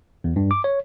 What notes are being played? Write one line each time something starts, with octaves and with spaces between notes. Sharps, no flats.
E2
G2
D6
C#5